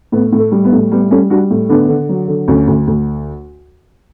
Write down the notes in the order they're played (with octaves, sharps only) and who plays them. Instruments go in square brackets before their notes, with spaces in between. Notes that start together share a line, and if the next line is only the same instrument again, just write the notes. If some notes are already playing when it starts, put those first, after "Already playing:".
[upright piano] A2 B3
A2
A3
G3
B3
A2
G3 B3
G3 A3 C#4
G3 D4 F#4
A2
D3 B3 D4
D3
F#3
D3
D2 A3 C#4
D2
D2